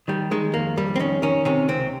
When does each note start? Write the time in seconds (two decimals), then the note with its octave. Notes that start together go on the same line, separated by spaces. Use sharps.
0.08 D#3 G3
0.31 D#3 G#3
0.54 F2 A#3
0.77 F2 G3
0.96 C4
0.99 D#3 C#4
1.22 D#3 C#4
1.45 C3 C#4
1.68 C#2 C4